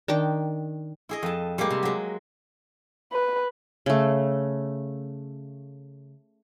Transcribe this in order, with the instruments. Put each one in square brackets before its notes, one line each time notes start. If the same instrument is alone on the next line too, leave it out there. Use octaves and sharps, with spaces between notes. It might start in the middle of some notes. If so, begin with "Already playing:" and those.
[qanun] D#3 D4 G5 D6
[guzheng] E4 G#4 D#5
F2 A5
G3 G#3 A#3 G4
C3
F#3 G#3
[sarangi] B4
[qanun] C#3 A3